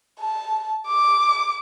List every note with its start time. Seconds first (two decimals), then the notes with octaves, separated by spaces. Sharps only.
0.20 A5
0.87 D6